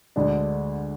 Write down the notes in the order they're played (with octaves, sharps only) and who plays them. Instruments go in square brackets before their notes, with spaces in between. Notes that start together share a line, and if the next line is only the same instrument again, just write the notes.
[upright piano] D2 D3 G#3 D4